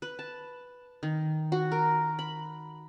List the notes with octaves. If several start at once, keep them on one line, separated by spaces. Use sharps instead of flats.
B4
A5
D#3
F#4
A#4
B5